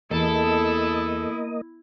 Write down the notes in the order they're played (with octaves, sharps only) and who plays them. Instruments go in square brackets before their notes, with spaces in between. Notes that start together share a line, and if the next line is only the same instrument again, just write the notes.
[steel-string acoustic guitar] E2 [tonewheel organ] A#3 D#5 [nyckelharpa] E4 [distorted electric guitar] A4